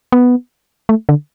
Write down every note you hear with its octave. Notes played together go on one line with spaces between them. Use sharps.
B3
A3
D3